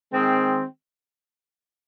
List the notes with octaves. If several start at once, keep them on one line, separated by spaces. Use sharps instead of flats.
D#3 G#3 C4